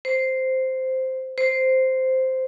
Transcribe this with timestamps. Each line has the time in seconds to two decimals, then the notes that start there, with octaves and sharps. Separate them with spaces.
0.05 C5
1.38 C5